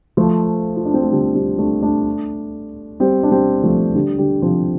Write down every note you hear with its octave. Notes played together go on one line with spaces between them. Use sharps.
F3 A3
F4
D4
C4
A3
D3 G3
G3 C4
A3 D4
A3 D4
G3 C4
D4
G3 C4
F3 A3
D3 G3
D3 G3
C3 F3